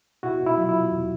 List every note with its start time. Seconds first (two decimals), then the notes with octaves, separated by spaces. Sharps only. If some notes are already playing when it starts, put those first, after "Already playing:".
0.23 B2 E4 F#4
0.40 B2
0.46 E4
0.57 F#3 F4
0.69 B2 E4
0.91 E2